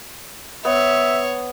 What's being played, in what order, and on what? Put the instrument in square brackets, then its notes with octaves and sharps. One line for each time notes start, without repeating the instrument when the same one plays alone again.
[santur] B3 [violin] C#5 [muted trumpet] E5